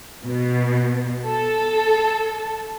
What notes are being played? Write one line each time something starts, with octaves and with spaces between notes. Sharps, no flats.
B2
A4